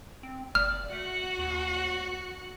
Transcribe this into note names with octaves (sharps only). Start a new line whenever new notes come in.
C4
F#1 D5 F6
A3 F#4 F#5
D#2